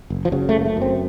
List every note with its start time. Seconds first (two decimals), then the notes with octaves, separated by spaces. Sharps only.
0.10 F#1
0.25 F3
0.32 C#3 F#3
0.49 A3
0.54 F#1
0.61 A#3
0.66 A3
0.77 F#2 C4